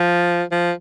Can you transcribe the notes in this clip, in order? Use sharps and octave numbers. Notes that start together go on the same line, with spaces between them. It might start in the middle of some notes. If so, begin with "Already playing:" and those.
Already playing: F3
F3